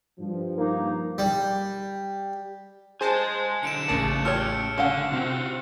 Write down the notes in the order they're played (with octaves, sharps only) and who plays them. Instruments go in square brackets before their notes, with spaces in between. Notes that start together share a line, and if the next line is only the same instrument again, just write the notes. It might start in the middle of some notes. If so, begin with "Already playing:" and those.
[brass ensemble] G2 F3
[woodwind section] A#3 D#4
[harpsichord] G3
[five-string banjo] G#4 [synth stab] C5 A5 [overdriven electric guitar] D#5 G#5
[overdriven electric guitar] B1 D3 [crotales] C#7 D7 E7
[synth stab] A1 C#3 A5 [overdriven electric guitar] A3 G#4 [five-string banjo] A#3
[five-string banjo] F4 G4 C#5 [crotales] E6 F6 C#7
[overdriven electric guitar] D3 [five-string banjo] C#4 F5 F#5 [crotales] G7
[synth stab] C3 C4 [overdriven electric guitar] F4 F#4